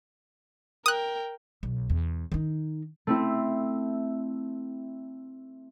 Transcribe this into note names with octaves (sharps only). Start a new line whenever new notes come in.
A#4 G5 D#6 F#6
B1
E2
D#3 D#4
A3 C4 E4